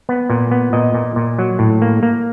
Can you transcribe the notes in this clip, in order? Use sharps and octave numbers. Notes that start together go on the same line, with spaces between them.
B3
A#2
B3
A#2 D#5
A#2
A#2
F#3
A2
A#3
A#3